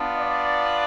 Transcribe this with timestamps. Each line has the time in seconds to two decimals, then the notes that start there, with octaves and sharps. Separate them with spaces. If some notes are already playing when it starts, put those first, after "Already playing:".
Already playing: B3 D4 F4
0.19 D5